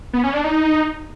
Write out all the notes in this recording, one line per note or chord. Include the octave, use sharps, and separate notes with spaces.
B3
C#4
D4
D#4